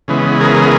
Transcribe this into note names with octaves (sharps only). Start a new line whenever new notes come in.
C#3 E3 G#3 B3
G#4 A#4